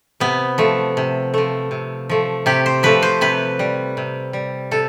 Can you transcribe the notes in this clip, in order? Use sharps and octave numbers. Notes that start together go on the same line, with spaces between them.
C3 B3
F3 A3
C3
F3 A3
C3
F3 A3
C3 G4
C5
F3 A3 B4
C5
C3 B4
G3
C3
G3
C3 A4